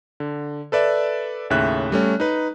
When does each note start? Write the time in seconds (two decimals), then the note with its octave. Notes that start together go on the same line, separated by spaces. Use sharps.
0.20 D3
0.72 A4 B4 D5 E5
1.50 D#2 A2 C#3 E5 F#6
1.92 G3 A3 C#4
2.20 D#4 B4